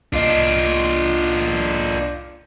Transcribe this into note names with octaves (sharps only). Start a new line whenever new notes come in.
C2 D4 F4 D#5